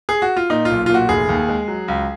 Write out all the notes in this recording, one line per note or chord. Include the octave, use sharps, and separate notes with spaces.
G#4
F#4
F4
A#2 D#4
F4
B1
F4
A#2 F#4
F1 G#4
D#2
G#3
F#3
C#2